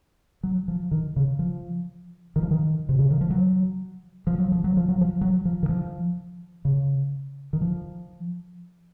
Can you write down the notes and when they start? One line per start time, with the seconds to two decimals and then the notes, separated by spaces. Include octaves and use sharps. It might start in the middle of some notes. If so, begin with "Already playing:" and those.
0.43 F#3
0.68 F3
0.91 D#3
1.16 C#3
1.39 F3
2.36 D#3
2.43 F3
2.51 D#3
2.89 C3
2.99 C#3
3.10 D#3
3.21 F3
3.30 F#3
4.27 F3
4.38 F#3
4.52 F3
4.64 F#3
4.77 F3
4.88 F#3
5.01 F3
5.21 F#3
5.45 F3
5.63 D#3
5.69 F3
6.65 C#3
7.53 D#3
7.61 F3